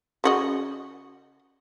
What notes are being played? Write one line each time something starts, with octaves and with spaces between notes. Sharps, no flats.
C#3 F#4 D#5